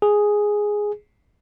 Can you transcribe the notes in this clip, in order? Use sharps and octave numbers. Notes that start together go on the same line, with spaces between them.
G#4